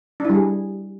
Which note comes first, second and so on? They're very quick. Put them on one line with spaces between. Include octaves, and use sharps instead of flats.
D4 E4 G3 G#4